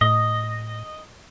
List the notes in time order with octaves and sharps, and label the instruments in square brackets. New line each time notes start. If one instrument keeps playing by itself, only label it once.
[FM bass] A2 [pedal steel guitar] D#5